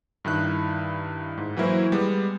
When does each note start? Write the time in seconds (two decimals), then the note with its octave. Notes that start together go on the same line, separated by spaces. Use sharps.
0.25 G2 D#3 E4 F#6
1.37 G#2
1.57 E3 F#3 A#3 E4 A#4 C5
1.92 G3 G#3 B3